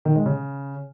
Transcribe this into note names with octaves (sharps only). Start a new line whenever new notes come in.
D#3
G#3
C#3